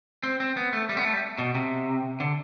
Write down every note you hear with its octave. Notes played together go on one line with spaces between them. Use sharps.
C4
C4
B3
A3
G3
B3
A3
G3
B2
C3
D3